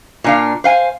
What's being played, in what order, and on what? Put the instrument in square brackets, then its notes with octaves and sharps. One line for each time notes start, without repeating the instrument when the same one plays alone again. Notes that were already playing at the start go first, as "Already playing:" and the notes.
[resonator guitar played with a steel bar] A#2 D4 F5
C5 F5 G#5